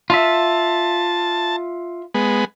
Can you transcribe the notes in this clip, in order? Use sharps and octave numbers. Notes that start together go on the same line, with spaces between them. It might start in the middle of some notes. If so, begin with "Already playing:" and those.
F4 E5 A5
G#3 B3